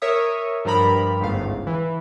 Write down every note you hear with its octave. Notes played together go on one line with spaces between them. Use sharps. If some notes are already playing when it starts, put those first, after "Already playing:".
A#4 C#5 E5 D#6
G2 F3 G3 A#4 A#5 B5
G1 C#2 G#2 A3 F5
E3